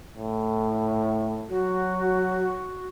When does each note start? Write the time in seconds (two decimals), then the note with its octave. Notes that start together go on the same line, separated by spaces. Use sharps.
0.15 A2
1.50 F#3 F#4